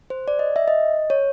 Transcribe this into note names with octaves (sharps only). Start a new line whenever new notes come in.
C5
D5
D#5
E5
D#5
C#5